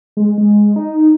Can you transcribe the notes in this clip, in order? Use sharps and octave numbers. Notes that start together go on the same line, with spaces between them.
G#3
G#3
D#4